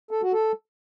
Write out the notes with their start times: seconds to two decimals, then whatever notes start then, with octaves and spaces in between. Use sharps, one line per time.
0.11 A4
0.22 F#4
0.33 A4